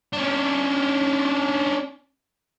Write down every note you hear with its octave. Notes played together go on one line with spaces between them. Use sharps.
C#4 D4